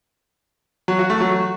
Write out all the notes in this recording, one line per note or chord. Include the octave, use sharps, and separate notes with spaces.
F#3
F#4
A3
F#3